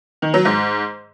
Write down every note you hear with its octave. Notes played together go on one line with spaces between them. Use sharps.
D#3
F#3
G#2